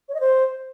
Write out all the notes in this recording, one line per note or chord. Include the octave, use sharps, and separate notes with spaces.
C#5
D#5
C5